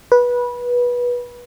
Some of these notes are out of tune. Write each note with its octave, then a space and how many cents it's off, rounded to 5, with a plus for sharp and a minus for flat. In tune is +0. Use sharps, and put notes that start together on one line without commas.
B4 -20